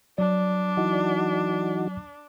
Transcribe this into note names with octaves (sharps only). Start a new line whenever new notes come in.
F#3 D4 D5
E3 D#4 F#4